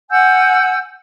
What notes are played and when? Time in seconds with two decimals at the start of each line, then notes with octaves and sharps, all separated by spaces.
0.10 F#5 G#5 E6 G6